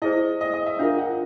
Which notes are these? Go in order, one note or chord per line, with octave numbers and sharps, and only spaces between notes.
E4 G#4 C5 D#5
D#5
D#5
E5
D4 F4 A#4 F5
F#5